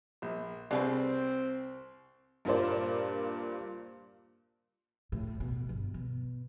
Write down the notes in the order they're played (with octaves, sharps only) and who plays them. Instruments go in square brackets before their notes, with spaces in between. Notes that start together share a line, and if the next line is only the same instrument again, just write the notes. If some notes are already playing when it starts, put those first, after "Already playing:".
[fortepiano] A#1
[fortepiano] C2 [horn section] C4 [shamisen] D4 G#4 B4
[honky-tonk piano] G2 A#2 A#3 F4 C5 D5
[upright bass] A2
B2
G1
B2